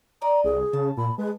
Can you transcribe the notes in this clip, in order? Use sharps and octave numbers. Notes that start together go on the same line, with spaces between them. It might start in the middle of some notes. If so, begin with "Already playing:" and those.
D5 D#5 A#5
C2 G#4
C#3 A5
A#2 B5
G#3 B4